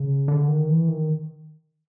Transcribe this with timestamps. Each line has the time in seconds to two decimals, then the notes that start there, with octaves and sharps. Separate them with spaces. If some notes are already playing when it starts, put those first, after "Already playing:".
Already playing: C#3
0.28 D3
0.48 D#3
0.69 E3
0.88 D#3